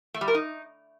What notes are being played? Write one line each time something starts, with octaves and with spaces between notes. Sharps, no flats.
A3
G3
A#4
D#4